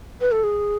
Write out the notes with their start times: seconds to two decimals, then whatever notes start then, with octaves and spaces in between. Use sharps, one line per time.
0.21 B4
0.32 A4
0.44 G#4